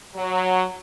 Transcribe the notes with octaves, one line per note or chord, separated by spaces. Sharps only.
F#3